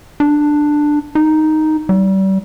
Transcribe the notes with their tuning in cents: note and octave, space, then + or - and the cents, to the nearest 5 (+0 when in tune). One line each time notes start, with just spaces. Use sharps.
D4 +10
D#4 +0
G3 -35